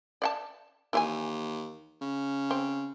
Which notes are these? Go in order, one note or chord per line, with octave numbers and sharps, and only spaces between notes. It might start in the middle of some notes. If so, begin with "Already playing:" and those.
D5 F#5 A5
D#2 E3 F4 G#5
C#3
C4